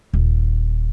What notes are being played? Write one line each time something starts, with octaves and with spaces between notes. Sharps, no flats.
D#1